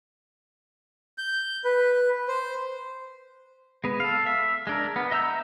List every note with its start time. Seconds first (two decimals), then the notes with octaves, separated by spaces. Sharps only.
1.18 G6
1.65 B4
2.28 C5
3.84 G#3 B3
4.00 A4 F5
4.26 E5
4.67 G#3 D4 A#4
4.96 B3
5.11 D#5 E5 A#5 E6 G6